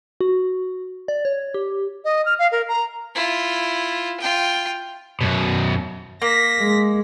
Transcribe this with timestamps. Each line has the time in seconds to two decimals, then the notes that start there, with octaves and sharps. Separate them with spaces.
0.21 F#4
1.08 D5
1.25 C#5
1.54 G4
2.05 D#5
2.25 F6
2.39 F5
2.52 A#4
2.68 A#5
3.15 E4 F4
4.20 F4 G5
5.21 F#2 B2
6.22 A#3 A#6 B6
6.60 G#3